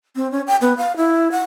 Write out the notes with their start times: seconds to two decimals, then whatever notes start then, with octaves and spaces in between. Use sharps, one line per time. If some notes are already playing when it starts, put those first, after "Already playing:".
0.16 C4
0.32 C#4
0.47 G5
0.61 B3
0.77 F5
0.97 E4
1.32 F#5